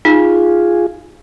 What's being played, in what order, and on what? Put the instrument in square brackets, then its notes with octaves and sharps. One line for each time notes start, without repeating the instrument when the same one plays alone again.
[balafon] D#4 [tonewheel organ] F4 G#4